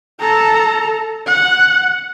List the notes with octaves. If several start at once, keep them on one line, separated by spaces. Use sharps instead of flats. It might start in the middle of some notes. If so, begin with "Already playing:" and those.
A4 A#5
F#5